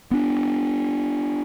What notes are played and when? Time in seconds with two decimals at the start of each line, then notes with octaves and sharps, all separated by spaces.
0.11 B3 D4